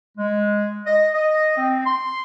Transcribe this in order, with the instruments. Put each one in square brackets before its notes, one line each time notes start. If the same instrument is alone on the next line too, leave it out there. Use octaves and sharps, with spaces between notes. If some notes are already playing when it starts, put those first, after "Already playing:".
[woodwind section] G#3
D#5
D#5
C4
C6